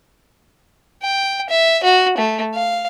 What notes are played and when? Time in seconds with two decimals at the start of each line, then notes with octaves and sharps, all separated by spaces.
1.02 G5
1.50 E5
1.83 F#4
2.18 A3
2.54 F5